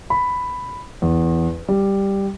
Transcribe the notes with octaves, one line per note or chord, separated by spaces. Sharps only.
B5
E2
G3